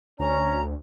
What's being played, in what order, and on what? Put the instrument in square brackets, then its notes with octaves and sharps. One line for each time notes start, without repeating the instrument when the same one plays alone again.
[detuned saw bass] D2 [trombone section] C#4 [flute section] A#5